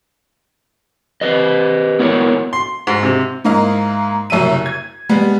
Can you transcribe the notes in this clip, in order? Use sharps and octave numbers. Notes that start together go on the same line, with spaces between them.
G4 B4 D#5
B3 E4 F#4 A#4 C#5
C6
G#2
C3
G#2 A#3 E4 D#5 F5 A#5
F#1 C2 F#2 F#3 E5 D#7
G#6
G3 G#3 B3